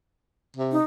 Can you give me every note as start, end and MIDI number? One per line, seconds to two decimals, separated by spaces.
0.56 0.78 48
0.72 0.84 63